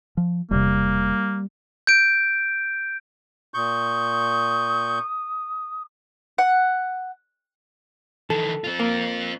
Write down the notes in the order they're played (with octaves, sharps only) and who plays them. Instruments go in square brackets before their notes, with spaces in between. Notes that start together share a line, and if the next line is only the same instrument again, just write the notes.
[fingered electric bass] F3
[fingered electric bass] E1 C3 [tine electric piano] G3 [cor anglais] A#3
[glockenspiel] G6 D7
[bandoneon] A#2 C#6 G6 [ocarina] D#6
[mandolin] F#5
[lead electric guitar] D#3 E3 [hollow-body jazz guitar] A4
[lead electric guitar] C4 F4
[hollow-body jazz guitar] A#3